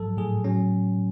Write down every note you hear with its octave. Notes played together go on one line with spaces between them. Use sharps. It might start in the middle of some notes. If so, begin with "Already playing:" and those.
Already playing: G#2 F3 F#3 A4
A2 G#4
F#3 C#4